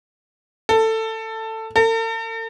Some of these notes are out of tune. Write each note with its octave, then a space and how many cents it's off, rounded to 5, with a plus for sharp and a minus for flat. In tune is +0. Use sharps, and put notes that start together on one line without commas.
A4 +15
A4 +45